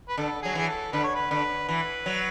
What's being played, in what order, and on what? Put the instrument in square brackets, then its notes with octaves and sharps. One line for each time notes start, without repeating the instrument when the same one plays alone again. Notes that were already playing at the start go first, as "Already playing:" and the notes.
[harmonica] B4
[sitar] D3 [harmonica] A4
[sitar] F#3 [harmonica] G#4
[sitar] E3 [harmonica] G#4
[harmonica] A4
[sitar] D3 [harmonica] B4
[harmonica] C#5
B4
[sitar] D3 [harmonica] B4
[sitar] E3 [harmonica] B4
[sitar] F#3